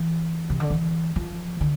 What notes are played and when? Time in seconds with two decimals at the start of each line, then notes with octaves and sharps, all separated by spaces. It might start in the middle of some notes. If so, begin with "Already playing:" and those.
Already playing: E3
0.50 C3
0.60 D3
0.70 E3
1.16 F3
1.61 D3